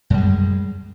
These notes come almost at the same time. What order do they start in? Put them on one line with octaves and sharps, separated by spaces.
F#2 G3 G#3